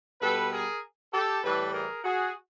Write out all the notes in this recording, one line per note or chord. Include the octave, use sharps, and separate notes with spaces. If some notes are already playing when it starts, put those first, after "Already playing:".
B2 G3 A4 B4
G#4 A#4
G4 A4
A2 E3 G3 A4 B4
G#4 A#4
F#4 G#4